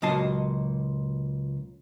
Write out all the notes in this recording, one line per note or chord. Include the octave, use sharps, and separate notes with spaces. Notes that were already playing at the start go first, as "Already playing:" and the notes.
C#2 A#2 F#3 D#5 A5 C6